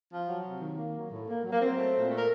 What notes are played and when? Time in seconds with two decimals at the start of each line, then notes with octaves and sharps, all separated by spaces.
0.10 F3
0.27 F#3
0.43 C3
0.60 D#3
0.77 A#3
0.94 F#3
1.11 A2
1.27 A#3
1.44 F#3
1.52 A#3
1.60 F#3 C4
1.77 A3
1.94 A#2
2.11 A3
2.17 A#4